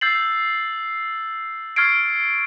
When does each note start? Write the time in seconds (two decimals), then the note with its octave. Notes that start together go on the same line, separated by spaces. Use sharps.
0.01 E6 G6 A6 C7 F#7
1.76 C#6 F6 G#6 A6 C7 D7